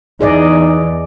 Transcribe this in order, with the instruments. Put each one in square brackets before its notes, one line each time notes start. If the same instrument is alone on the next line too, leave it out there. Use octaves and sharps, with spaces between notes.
[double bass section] E2 E3 [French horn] D#4 [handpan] G#4 D5 D#5